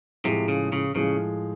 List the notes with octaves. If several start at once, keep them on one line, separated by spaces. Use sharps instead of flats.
A2 C3 F3 G#3
C#3
C#3
A2 C#3 F3 G#3